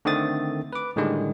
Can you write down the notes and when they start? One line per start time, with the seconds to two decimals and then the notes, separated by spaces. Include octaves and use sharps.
0.05 D3 D#3 A3 C4 D#6 A6
0.73 B4 D6
0.96 A2 D3 D#3 G3 G#3